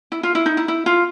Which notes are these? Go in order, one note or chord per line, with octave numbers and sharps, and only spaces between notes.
E4
F4
E4
D#4
E4
E4
F4